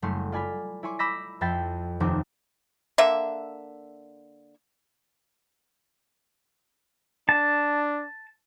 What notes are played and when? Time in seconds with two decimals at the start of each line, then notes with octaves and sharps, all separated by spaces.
0.02 F#1 G3 A3 G4 C6
0.32 F4 D5 G#5 B5 F6
0.83 E4 C#5 G#5 C6 D6
0.99 B5 D6 E6 G6 A#6 B6
1.41 F2 E5 G5 B5 A6 C7
2.00 F1 D#2 B3 C4 D6
2.98 D3 A#3 E5
7.29 D4 A5